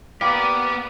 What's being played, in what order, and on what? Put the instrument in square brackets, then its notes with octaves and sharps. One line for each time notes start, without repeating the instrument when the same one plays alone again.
[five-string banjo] A#3 [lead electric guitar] B3 [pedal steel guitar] G4 D5